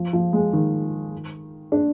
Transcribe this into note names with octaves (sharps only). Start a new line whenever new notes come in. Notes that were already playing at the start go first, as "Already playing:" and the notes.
Already playing: F3
F3
G#3
D#3
D4